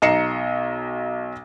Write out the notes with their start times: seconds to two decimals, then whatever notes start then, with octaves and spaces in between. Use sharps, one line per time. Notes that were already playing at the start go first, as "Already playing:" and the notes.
0.02 B1 D#5 A#5 C7 C#7 E7